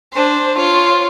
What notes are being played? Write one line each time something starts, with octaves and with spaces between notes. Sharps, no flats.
D4 C5
F4 C#5